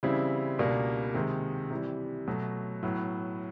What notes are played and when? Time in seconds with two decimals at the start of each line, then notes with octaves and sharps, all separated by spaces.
0.03 C#3 E3 G3 C4 E4
0.59 C#2 B2 G3 A#3 D4
1.14 C3 D#3 G#3
1.71 C3 E3 G3
2.27 B2 F#3 A3
2.83 A2 F#3 B3